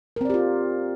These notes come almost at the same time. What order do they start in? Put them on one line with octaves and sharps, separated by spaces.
A#4 C4 D5 G4 F4